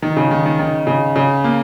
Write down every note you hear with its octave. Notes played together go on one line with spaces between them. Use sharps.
D#3
C#3
D#3
D#3
D#3
C#3
C#3
A#3